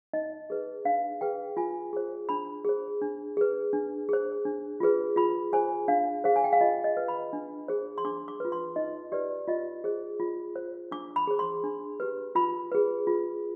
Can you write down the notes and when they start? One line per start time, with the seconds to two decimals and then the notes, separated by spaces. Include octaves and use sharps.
0.13 D#4 D#5
0.50 G#4 B4
0.85 D4 F5
1.21 G#4 B4 G5
1.57 F4 G#5
1.93 G#4 C5
2.29 D4 B5
2.64 G#4 C5
3.01 D4
3.37 G#4 B4
3.73 D4
4.09 G#4 C5
4.45 D4
4.80 F4 G#4 B4
5.16 F4 B5
5.53 G#4 C5 G#5
5.88 D4 F5
6.24 G#4 C5 F5
6.36 G#5
6.44 G5
6.53 F5
6.61 F4 D#5
6.84 D#5
6.97 B4
7.08 B5
7.33 D4
7.68 G#4 C5
7.98 C6
8.05 D4 D6
8.28 D6
8.40 F4 B4
8.52 C6
8.76 D#4 D#5
9.12 G4 B4 D5
9.48 F4 D#5
9.84 G#4 C5
10.20 F4
10.56 C5
10.91 D4 D6
11.16 B5
11.27 G#4 C5
11.39 C6
11.64 D4
12.00 G4 B4
12.35 F4 B5
12.72 G#4 B4
13.07 F4